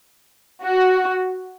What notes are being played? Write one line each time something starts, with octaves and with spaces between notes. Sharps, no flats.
F#4